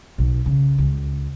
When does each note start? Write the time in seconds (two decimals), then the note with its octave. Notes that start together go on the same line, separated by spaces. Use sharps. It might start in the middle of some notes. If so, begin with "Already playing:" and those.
0.18 B1
0.46 C#3
0.78 C#2